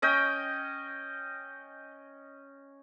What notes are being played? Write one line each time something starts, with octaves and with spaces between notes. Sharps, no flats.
C#4 D#5 G5